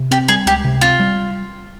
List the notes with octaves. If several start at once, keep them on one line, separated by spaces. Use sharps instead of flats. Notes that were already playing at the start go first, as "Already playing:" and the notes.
Already playing: C3
C4 G4
G3 G#4
C#2 G4
C3
C4 F4
G3